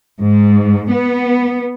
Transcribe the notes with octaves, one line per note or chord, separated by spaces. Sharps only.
G#2
B3